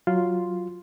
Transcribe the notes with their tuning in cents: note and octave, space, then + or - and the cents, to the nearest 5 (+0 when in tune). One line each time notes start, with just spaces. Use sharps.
F#3 +0 F4 +0 C6 +0